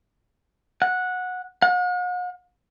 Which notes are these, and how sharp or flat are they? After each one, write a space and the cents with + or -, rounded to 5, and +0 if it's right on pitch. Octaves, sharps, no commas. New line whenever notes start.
F#5 -15
F#5 -45